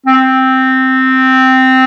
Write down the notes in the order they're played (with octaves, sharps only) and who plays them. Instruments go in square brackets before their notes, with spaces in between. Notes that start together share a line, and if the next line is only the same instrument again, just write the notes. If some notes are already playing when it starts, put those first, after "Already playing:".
[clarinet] C4